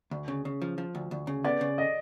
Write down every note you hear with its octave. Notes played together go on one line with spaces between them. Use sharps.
D2
C#3
C#3
F3
F3
D2
D2
C#3
B3 D5
C#3
D#5